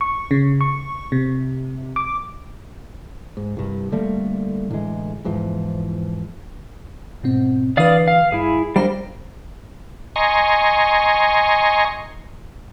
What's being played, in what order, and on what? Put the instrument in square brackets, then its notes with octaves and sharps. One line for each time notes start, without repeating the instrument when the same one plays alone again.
[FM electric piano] C#6
C#3
C#6
C3
D6
[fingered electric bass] G#2
C2 G2
D3 G3 A3 A#3
A2 D3 E3 G#3
E2 G#2 E3 F3
[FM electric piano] G#2 B2 C4
[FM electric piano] D3 E3 B4 [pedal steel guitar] D5 F5 D#6
[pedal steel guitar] F5
[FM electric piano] G2 [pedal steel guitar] E4 G#4
[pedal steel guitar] G3 D4 A#4 [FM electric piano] C5 F5 A#5
[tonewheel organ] D#5 G#5 A#5 C6 C#6